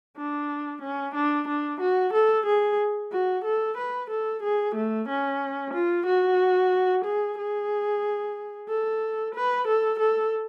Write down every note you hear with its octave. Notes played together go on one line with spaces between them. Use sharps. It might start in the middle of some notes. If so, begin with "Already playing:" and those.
D4
C#4
D4
D4
F#4
A4
G#4
F#4
A4
B4
A4
G#4
A3
C#4
F4
F#4
G#4
G#4
A4
B4
A4
A4